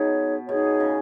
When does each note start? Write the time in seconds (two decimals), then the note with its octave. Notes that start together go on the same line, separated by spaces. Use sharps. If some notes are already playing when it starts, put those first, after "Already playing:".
Already playing: B2 D#4 G#4 C#5
0.48 B2 D#4 G#4 C#5
0.80 C#3